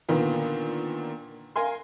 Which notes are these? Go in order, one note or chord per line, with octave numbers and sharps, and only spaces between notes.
A#2 D3 D#3 A#3 B3
A#4 F5 G#5 C6